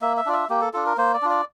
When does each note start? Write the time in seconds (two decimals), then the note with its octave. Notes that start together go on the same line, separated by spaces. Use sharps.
0.02 A#3 E5
0.17 E5
0.26 D4 F4 D5
0.33 E5
0.50 A#3 G4
0.61 A4
0.73 D4 F4 A4
0.86 A#4
0.97 A#3 C5
1.14 D5
1.22 D4 F4
1.30 D5